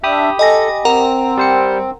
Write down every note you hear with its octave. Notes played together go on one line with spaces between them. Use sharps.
D4 G4 E5 B5 D#6
A4 D#5 G#5 A#6
C4 A#4 F#5 A#5
G3 C5 C#7